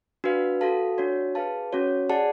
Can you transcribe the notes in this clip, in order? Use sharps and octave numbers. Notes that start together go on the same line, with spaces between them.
D4 F#4 B4 F5
F#4 A4 F5 A5
D4 F#4 C#5
G#4 B4 F5 A5
C#4 F#4 C#5
G#4 D5 F#5 A5